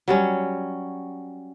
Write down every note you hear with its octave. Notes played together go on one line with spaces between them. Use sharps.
F#3 G3 C#4